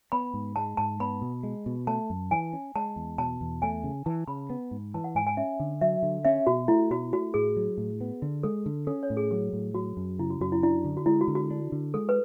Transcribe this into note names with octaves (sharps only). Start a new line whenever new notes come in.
B3 B5
G#2
G#3 A5
G#2 A5
B3 B5
B2
G#3
B2
A3 A5
F#2
E3 G#5
C#4
G#3 A5
E2
B2 A5
E2
A3 G#5
C#3
E3 A5
C#3 B5
B3
G#2
E3 A5
F#5
G#2 G#5
G#5
C#4 E5
D3
F#3 E5
D3
C#4 E5
B2 F#4
A3 E4
B2 F#4
A3 F#4
A2 G#4
F#3
A2
B3
D3
G#3 A4
D3
C#4 A4
C#5
A2
G#4
F#3 G#4
A2
F#3 F#4
F#2
C#3 E4
F#4
F#2 F#4
E4
D4 E4
D3
F#4
G#3 E4
F#4
D3
F#4
D4
D3
G#3 A4
B4